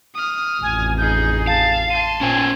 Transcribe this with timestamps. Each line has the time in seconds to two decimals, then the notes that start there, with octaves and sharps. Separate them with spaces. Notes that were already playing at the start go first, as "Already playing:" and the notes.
0.15 D#6 F6
0.62 A1 F2 G#5
0.98 D#4 G#4 G6
1.47 F5 A5
1.90 A5 C6 D#7
2.21 A#2 C#4 C5 G#5